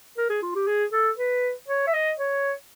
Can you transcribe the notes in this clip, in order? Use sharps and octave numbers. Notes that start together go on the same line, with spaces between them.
A#4
G#4
F4
G4
G#4
A4
B4
C#5
E5
D#5
C#5